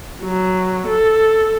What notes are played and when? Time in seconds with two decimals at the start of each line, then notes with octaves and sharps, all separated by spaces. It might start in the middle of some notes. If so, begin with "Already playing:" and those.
0.23 F#3
0.87 A4